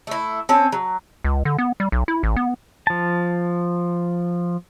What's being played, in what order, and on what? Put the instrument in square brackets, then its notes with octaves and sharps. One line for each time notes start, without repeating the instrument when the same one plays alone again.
[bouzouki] A3 E4
C4 C#4 A5
F#3
[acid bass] C#2
D3
B3
G3
B1
E4
A1
B3
[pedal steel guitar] F3 A5